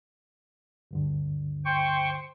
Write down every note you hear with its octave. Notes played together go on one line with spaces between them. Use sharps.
D2 G2 D3
C5 G5 C#6